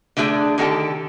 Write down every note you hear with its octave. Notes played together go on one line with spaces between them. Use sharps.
D3 A3 D4 G4 G#4 D5
D3 D#3 G4 A4